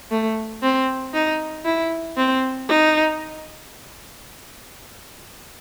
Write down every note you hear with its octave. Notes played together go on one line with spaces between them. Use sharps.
A3
C4
D#4
E4
C4
D#4